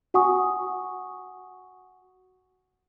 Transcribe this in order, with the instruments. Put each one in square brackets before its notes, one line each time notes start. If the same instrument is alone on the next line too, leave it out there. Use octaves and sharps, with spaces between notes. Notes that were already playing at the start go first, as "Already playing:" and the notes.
[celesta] F#4 F#5 G#5 C#6 D#6